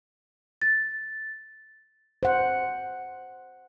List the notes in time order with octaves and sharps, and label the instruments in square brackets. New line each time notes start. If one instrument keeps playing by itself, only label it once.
[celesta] A6
[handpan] C5 F#5